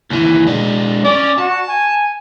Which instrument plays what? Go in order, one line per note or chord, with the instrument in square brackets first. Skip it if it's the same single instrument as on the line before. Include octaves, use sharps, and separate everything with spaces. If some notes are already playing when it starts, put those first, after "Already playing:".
[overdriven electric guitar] D#2 E3
G#3 D4
[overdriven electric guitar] C#4 [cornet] D5
[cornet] F#4 [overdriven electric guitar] A5
[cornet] G#5